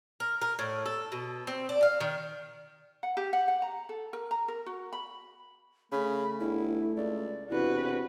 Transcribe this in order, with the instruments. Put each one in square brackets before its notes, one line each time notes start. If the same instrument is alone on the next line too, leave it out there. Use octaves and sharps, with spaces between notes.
[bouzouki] A#4
A#4
A2
A4
B2
C4
D4
F5
D#3
[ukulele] F#5
G4
F#5
F#5
A#5
A4
A#4
A#5
A#4
F#4
B5
[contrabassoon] C#3 [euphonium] A3 [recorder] B5
[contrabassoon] G1 [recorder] E4
[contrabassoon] C#2 [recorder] D5
[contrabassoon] E1 [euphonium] C3 [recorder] E4 [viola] F#4 B4